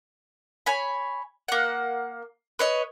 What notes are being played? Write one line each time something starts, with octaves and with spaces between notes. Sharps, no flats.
C#5 G#5 B5
A#3 F#5
B4 C#5 D#5